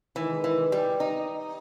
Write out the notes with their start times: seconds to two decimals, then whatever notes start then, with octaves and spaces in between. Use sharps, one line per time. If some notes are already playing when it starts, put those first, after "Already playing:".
0.16 D#3 E3 G#3 D#4
0.44 E3
0.72 G3
1.00 D#4